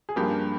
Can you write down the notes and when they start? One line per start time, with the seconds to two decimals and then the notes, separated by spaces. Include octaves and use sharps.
0.09 G#4
0.16 G2 F3 A#3 G4